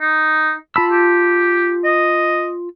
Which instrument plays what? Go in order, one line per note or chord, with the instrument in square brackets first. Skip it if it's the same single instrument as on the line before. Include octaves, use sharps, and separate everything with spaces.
[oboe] D#4
[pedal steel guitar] F4 A5 E6 [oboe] B5
[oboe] G4
D#5